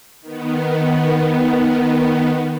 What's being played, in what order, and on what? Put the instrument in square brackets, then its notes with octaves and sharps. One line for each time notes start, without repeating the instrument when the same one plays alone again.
[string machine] D#3 B3